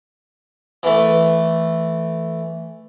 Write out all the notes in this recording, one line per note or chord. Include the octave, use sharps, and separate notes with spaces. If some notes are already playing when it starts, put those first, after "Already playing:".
E3 A3